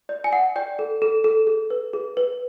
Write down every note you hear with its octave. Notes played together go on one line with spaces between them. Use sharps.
D5
G#5
F#5
D5 G5
A4
A4
A4
G#4
B4
G#4
B4